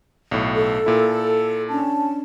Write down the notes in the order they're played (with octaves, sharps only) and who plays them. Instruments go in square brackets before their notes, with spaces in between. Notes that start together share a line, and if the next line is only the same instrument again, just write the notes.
[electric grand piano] B1 A2
[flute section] A4
[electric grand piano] A#2 E4
[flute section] C#4 D4 A5